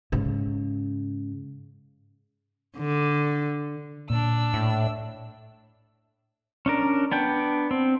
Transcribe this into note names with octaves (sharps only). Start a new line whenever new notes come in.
G#2 C#3
D3
A#2 D4 E6
A2
C#4 D4 A#4
B3 D4 G5
C4